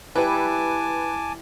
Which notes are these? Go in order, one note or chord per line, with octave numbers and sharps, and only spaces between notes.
G3 E4 B4 G#5 A5 D6